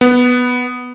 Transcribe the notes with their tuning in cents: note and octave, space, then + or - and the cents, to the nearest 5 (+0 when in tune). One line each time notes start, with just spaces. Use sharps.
B3 +0